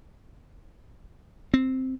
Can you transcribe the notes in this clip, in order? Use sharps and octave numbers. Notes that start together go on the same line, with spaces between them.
C4